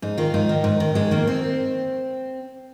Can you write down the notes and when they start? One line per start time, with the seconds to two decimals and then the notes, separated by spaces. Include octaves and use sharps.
0.02 G#2 D#4
0.18 D#3 F4
0.34 G#2 D#4
0.49 D#3
0.64 G#2
0.80 D#3
0.95 G#2 G#3
1.11 D#3 A#3
1.27 C4